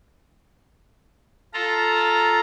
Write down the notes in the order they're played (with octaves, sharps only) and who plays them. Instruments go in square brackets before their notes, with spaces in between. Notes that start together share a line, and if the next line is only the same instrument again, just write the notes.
[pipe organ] F4 A4 A#5